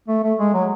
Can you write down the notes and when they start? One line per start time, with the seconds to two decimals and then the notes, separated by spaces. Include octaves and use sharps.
0.08 A3
0.23 A3
0.39 G#3
0.54 F#3